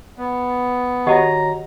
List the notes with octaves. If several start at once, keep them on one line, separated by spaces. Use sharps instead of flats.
B3
D#3 F#4 G4 C#5 D#5 F#5 A#5